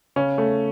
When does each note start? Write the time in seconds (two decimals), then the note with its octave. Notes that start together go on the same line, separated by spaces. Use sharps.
0.16 C#3 C#4
0.38 A3